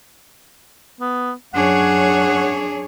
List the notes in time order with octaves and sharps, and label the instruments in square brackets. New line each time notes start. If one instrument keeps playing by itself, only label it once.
[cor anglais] B3
[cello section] F#2 C#5 [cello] D4 G#4 [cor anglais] F#5